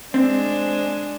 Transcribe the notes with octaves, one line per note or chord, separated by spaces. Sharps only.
G#3 C4 D4